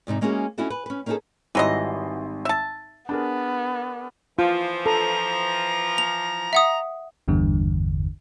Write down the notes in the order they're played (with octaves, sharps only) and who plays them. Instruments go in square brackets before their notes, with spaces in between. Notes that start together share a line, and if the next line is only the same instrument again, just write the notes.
[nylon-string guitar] E2 G#2 C3 D#4
G#3 A#3 C#4 E4 F#4 G#4
C#4 D#4 E4 F#4 A4
B4
C#4 B4
A#3 C#4 D#4 F#4 G#4 A4
[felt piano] G#1 G3 C6 [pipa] E3 F#3 D#5
[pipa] E5 A5
[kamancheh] B3 [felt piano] D4 G#4 A#4
[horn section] E3 F3 [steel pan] F4
[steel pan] A4 [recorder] A#5
[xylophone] F7
E5 F#5 D#6
[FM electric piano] G#1 E2 G2 D3